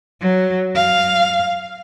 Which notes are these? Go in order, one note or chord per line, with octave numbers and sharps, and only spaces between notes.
F#3
F5